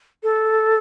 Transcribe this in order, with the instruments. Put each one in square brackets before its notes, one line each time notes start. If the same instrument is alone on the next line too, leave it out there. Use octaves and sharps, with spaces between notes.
[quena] A4